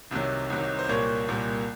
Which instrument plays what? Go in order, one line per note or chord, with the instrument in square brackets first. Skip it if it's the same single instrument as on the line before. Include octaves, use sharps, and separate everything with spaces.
[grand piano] C2 C3 D#3 F#3
C2 C3 D#3 F#3
C5
C2 A#2 G3 A#3 C#5
C2 A#2 G3 A#3